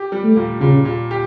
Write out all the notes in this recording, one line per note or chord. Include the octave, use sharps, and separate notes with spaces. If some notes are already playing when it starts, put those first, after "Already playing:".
Already playing: G4
G3
A3
A#2
A#2 C#3
A#2
G4